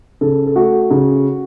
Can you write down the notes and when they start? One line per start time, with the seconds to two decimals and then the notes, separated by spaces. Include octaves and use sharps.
0.21 C#3 A4
0.47 A4
0.56 A3 F#4
0.91 C#3